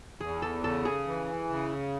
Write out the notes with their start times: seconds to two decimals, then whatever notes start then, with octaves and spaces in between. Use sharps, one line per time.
0.20 E2 G#4
0.42 A4
0.64 C#3 A4
0.85 G#4
1.07 E3
1.49 C#3